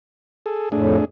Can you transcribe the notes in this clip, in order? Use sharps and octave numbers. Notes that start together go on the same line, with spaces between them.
G#4 A4
F2 A2 A3 D4 G#4